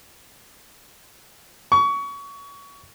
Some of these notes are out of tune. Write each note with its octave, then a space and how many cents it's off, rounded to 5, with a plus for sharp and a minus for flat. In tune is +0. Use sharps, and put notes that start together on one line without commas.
C#6 +25